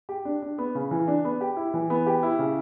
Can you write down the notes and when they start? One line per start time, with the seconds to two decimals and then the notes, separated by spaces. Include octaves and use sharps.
0.09 G4
0.25 D4
0.42 D4
0.58 B3
0.75 C#3
0.91 E3
1.08 D4
1.25 B3
1.41 G4
1.57 E4
1.74 E3
1.90 B3
2.06 G4
2.23 E4
2.39 C#3